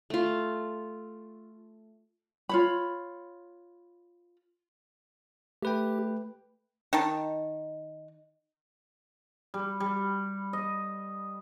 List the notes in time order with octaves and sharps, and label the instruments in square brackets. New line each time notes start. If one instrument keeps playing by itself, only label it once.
[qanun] A3 F4
[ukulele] F4 C#5 B5
[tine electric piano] A3 B4 G5 [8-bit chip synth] G4
[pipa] D#3 D#4 A5
[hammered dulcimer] G3
G3
D#5